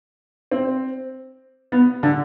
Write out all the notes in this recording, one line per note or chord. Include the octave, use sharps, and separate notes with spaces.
C4
B3
D3